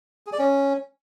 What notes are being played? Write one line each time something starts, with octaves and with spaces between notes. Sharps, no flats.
G#4
D5
C#4